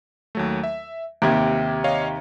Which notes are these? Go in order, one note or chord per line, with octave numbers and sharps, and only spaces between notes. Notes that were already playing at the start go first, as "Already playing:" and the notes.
D#2 F#3 A3
E5
D#2 C3 G#6 D7
C#5 D#5 F5